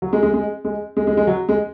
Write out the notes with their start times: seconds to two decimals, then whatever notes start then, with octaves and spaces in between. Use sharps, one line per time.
0.02 F#3
0.13 G#3
0.23 G#3
0.34 G#3
0.65 G#3
0.97 G#3
1.07 G#3
1.17 G#3
1.27 F#3
1.49 G#3